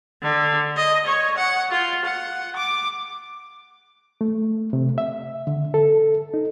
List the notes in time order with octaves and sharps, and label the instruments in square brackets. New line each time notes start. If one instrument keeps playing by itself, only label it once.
[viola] D3
D#5
C#5
F#5
F4
F#5
D6
[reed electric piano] A3
C3
E5
D3
A4
D#4